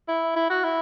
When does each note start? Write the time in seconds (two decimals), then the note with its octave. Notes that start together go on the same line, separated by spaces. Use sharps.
0.08 E4
0.36 E4
0.50 F#4
0.64 E4